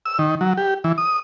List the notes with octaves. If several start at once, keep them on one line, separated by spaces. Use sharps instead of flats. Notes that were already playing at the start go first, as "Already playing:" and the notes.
E6
D#3
F#3
G4
E3
D#6